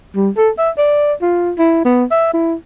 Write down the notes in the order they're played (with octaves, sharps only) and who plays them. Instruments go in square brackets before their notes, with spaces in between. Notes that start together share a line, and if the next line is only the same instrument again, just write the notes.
[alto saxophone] G3
A4
E5
D5
F4
E4
B3
E5
E4